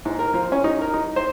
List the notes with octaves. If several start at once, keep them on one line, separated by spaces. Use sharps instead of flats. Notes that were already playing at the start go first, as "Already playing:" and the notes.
G#2
A#4
F3
C#4
D#4
A#4
D#4
C5